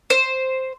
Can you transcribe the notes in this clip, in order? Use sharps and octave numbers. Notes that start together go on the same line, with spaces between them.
C5